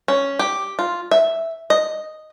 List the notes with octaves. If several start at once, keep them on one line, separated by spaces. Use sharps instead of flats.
C#4
G4
F4
E5
D#5